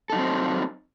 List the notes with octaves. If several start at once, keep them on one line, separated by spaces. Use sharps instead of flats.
F#3 C4 D#4 A4